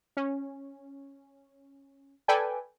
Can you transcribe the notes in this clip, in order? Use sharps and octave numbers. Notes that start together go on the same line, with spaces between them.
C#4
A4 B4 D5 G5 G#5